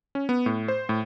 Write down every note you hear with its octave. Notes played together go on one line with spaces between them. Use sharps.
C#4
B3
A2
C5
A2